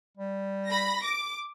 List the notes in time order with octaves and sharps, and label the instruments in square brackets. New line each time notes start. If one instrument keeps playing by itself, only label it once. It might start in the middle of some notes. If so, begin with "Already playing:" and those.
[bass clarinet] G3
[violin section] B5 A#6
D6